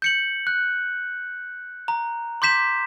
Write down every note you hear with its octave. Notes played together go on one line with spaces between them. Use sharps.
G6 C#7 F#7
F#6
A#5
C6 D6 G6 B6 E7